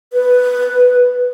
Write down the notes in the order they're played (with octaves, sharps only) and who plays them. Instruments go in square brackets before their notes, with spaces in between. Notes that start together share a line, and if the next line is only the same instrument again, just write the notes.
[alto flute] B4